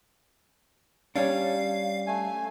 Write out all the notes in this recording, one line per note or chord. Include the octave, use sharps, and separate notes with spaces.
G3 C#4 D4 F5
A3 G#5